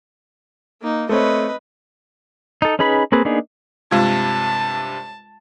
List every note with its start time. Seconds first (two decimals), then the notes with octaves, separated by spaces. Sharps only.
0.81 A#3 D#4
1.09 A3 C4 B4 C#5 D#5
2.62 D#4 A4
2.79 C#4 D#4 G#4 B4 B5
3.12 A#3 C4 G#4 B4
3.25 A#3 B3 D4 D#4 G#4
3.91 G2 C3 G#3 F4 A5 G#6